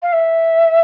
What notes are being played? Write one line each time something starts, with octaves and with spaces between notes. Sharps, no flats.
F5
E5